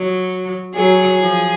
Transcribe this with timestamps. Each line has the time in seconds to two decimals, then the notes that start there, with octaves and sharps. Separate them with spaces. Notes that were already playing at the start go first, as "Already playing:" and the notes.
Already playing: F#3
0.75 F#3 G#4
1.20 F3